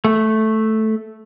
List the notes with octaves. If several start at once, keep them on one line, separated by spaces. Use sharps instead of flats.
A3